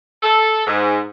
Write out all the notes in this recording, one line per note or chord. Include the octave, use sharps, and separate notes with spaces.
A4
G#2